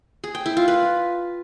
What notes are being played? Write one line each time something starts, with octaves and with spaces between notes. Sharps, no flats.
G#4
G5
E4
F4
B4